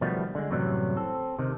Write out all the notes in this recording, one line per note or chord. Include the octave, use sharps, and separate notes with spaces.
B2 D#3 F3 G3 A3 B3
D3 G#3
F#2 A2 C3 E3 F#3 G3
C4 A4
C3 D#3